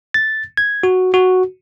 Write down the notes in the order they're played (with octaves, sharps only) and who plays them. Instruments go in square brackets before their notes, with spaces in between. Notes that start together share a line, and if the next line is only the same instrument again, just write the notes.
[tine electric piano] A6
G#6
F#4
F#4